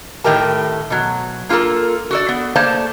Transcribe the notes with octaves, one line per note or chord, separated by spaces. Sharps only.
A2 D#3 A3 G4 A#4 A5
B2 F#3
A#3 F4 G4 A4 A#4
F#4 A4 D5
B3
A3 A#3 C5 D5 F5 A5